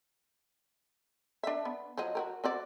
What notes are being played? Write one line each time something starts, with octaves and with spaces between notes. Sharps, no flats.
D4 E5
B3
F3 F#3 D#5
F#4 G4 A#4
C4 F#4 D5